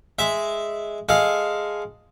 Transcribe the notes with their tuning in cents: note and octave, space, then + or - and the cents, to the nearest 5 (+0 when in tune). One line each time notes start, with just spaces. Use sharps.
G#3 +0 E5 +0
G#3 +0 A4 +0 F5 +0